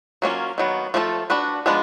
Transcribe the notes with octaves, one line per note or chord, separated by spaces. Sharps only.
F#3 A#3 C#4 F4
D#3 F#3 B3
F3 A3 D4 F4 A4
D4 F#4 B4
F3 G#3 B3 D4